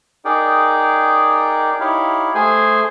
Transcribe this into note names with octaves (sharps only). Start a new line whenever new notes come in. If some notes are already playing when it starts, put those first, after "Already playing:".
D#4 G#4 A#4 D5 G5
D#4 E4 G4 C#5 F5
A3 G#4 C5 G#5